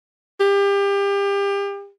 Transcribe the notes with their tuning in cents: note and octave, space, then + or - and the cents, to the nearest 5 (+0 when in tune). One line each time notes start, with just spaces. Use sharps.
G4 +30